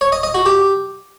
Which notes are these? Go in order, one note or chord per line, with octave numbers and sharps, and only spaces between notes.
C#5
D#5
D#5
F#4
G4